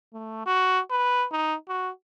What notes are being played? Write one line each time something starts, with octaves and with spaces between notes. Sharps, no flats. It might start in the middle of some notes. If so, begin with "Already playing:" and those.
A3
F#4
B4
D#4
F#4